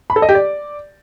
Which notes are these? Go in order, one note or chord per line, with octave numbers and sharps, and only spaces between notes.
B5
A4
D#5
G4
D5